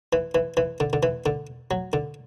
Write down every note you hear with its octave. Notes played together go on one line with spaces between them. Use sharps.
E3
E3
E3
D3
D3
E3
D3
F#3
D3